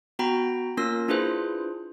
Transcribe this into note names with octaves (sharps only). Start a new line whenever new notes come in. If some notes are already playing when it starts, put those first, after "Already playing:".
B3 F#4 G5 A#5 B5
A#3 C#4 F4 A#4 E6 A#6
D4 E4 F4 G#4 B4 C5